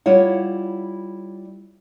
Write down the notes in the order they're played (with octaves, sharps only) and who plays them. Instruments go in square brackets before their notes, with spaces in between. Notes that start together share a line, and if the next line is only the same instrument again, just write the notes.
[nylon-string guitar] G3 E4 F4 C#5 F#5